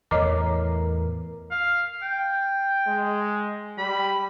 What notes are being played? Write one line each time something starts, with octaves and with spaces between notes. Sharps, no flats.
E2 A2 E3 A#4 C#5 D#5 D6
F5
G5
G#3
G3 B5